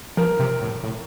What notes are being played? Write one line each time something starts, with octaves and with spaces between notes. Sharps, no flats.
F3 A#4
C3
A2
A2